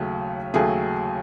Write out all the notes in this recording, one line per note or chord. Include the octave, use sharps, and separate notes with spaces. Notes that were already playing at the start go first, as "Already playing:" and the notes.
Already playing: D#2 C#3 F#3 A3
D#2 C#3 F#3 A3 G#4